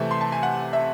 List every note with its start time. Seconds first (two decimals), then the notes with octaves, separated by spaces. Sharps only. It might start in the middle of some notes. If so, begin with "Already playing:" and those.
Already playing: C3 E3 A3 A5
0.11 C6
0.21 A5
0.32 G#5
0.43 F#5
0.73 E5